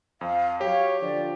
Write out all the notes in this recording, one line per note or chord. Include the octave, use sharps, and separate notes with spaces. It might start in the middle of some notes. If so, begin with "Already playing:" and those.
F2 F5
F#3 G4 C#5 F5
D3 F3 D5